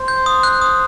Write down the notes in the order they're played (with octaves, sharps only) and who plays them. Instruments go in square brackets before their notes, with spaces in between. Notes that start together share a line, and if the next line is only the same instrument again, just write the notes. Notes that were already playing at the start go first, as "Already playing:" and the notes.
Already playing: [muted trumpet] C5
[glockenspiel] G6
D#6
F#6
D#6